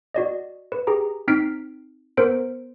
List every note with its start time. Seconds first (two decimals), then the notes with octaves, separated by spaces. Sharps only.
0.15 F#4 D5 D#5
0.72 B4
0.87 G4 G#4 A#5
1.28 C4 D#4 F6 B6 C7 D7
2.17 B3 A#4 C5 D7